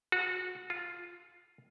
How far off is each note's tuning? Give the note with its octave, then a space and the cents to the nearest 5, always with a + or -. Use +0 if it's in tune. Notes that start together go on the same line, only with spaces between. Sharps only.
F#4 -25
F4 +5